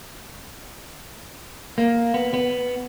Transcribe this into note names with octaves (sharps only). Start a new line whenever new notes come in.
A#3
B3
B3